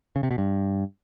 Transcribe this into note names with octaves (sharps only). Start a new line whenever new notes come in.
C#3
C3
B2
G2